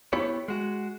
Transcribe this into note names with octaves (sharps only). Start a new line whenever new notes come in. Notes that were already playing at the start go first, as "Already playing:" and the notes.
B3 E4 G4 C#5
G#3 F#4